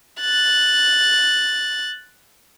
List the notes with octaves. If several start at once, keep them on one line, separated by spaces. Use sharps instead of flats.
F#6 A6